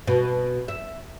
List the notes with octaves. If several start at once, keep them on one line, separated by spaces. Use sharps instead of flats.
B2
E5